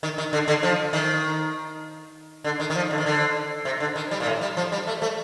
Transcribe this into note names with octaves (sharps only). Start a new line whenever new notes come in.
D#3
D#3
D3
D3
F3
D#3
D3
D#3
D#3
F3
D3
D#3
D3
C3
D3
D#3
G3
A#2
A2
G3
F3
G3
A3
A3